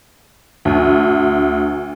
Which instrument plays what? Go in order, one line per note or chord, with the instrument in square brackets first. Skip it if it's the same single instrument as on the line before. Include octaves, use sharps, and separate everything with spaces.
[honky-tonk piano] D2